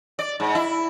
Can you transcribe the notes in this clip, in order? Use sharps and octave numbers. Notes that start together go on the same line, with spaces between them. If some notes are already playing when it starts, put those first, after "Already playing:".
D5
G#2
E4